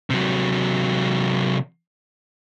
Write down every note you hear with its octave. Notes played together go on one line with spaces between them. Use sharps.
C3 F#3